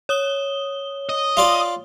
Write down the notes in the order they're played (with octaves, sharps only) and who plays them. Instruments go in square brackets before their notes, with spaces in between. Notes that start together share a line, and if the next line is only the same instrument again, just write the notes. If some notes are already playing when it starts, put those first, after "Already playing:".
[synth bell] C#5 D#6 G7
[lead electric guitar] D#5
[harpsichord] F4 D5